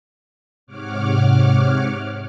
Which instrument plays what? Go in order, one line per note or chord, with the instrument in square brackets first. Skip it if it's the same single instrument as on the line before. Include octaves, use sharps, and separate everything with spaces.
[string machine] G#2 C3 C#5 F#5 D6 F6